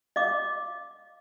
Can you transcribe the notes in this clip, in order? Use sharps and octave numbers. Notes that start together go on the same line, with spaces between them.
D#5 F5 D6